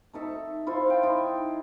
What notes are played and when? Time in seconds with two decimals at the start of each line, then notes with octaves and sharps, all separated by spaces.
0.13 A3 D#4 A4 E5
0.67 E4 F4 A4 C5
0.86 F5 G5
1.03 D#4 E4